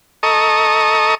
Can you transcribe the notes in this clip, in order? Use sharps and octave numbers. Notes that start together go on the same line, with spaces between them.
A4 D#5 A#5 C#6 D#6